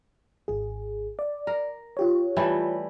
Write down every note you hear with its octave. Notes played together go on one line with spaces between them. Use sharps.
G#1 G#4
D5
A#4
F4 G4 C#5
E3 G3 A3